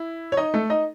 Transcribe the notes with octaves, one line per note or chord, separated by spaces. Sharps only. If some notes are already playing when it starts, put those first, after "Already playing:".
Already playing: E4
C#5
D#4 D#5
A3 A4
D#4 D#5